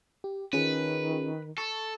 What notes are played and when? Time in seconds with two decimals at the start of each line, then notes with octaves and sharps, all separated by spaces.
0.24 G4
0.53 D#3 C#4 F4 G#4 B4
1.58 A4 C#6